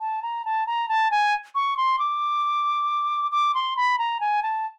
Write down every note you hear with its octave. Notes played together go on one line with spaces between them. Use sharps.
A5
A#5
A5
A#5
A5
G#5
C#6
C6
D6
D6
C6
B5
A#5
G#5
A5